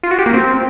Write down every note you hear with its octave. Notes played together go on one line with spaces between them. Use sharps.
F4
F#4
G4
A#3
C4